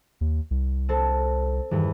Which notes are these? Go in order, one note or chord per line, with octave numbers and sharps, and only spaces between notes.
D#2
C2
C4 A4
E2 G2 D#3